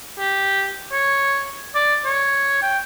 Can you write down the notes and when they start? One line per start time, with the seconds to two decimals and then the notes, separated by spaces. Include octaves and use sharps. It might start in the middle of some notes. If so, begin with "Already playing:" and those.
0.19 G4
0.92 C#5
1.75 D5
2.05 C#5
2.62 G5